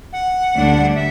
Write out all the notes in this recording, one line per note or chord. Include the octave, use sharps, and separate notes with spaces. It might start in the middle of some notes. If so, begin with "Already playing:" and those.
F#5
D2 D3 G3 D4
E5